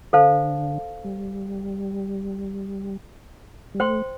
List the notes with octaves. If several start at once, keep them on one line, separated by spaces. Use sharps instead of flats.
D3 A4 C5 F5 A5
G3
G3
A3 C5 G5 C6